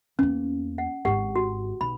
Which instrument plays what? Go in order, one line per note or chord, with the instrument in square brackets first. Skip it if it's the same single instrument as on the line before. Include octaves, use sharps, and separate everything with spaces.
[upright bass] E2 A#3 [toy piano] C#4
[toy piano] F#5
[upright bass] G#1 G#2 [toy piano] G4 F#5
[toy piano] F#4
[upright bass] B1 [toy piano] B5